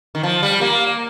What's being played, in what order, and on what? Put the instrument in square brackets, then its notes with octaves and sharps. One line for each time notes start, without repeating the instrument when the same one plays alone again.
[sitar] D#3
F3
G3
A#3